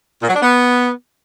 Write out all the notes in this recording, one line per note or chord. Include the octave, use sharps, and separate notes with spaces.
A#2
F#3
D4
B3